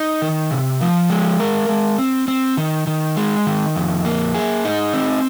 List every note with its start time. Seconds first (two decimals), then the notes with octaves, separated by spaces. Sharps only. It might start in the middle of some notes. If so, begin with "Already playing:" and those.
Already playing: D#4
0.22 D#3
0.51 C3
0.81 F3
1.10 G#3
1.40 A#4
1.69 G#3
1.98 C4
2.28 C4
2.57 D#3
2.87 D#3
3.17 G#3
3.47 D#3
3.75 F2
4.05 A#3
4.34 G#4
4.65 D#4
4.94 C4